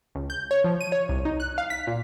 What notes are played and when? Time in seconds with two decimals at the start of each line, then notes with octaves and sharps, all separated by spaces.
0.15 C#2
0.30 G6
0.51 C#5
0.64 F3
0.81 D#7
0.92 C#5
1.09 C2
1.25 D#4
1.40 F#6
1.58 F5
1.70 B6
1.87 A#2